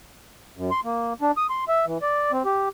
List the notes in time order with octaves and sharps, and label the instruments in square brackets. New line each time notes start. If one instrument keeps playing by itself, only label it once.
[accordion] F#2
C6
A#3
D4
D#6
C6
E5
E3
D5
C4
G4